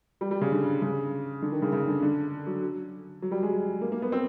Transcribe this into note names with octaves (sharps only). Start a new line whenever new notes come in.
G3
G3
C#3
D3
C#3
D3
D#3
C#3
C#3
D3
D3
F#3
F#3
G3
G#3
A#3
A#3
B3
C4